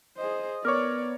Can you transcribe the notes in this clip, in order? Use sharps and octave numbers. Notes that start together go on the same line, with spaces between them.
G#4 C5 D#5
B3 A#4 C#5 D5 C#6 D6 F6